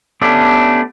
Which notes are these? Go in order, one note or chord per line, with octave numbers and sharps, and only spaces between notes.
A3 B3 C#4 D4 G4 A4